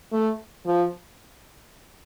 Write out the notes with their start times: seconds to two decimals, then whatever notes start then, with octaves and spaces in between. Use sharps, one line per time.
0.12 A3
0.66 F3